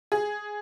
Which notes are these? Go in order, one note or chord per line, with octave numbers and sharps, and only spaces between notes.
G#4